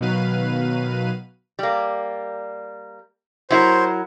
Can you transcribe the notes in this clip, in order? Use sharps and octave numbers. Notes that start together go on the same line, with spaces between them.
B2 D#3 F#3 B4 F5 D#7
G3 A#3
F#3 E4 A#4 C5